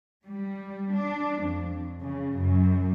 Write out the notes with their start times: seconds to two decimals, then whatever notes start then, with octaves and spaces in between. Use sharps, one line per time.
0.25 G3
0.94 D4
1.43 F2
2.01 C#3
2.37 F#2